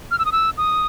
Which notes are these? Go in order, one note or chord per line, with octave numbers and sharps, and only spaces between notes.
F6
E6
D#6
E6
D#6